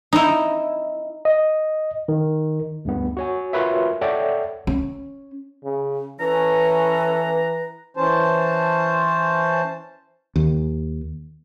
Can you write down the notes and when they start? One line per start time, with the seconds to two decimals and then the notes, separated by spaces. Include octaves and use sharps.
0.13 D#4 E4
1.25 D#5
2.08 D#3
2.85 D2 G2 B3
3.17 F#4 C#5 G#5
3.53 F4 F#4 A#4 B4 C#5 E5
4.01 A4 C#5 D5 E5 F#5 G5
4.67 C#4
5.65 C#3
6.20 E3 C#4 A4 B4 A#5
7.97 E3 C#4 C5 A5
10.36 D#2